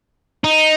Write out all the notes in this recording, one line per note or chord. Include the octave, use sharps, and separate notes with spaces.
D#4